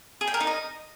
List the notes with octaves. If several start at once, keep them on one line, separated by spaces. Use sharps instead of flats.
G#4
G5
A#4
D#4
D#5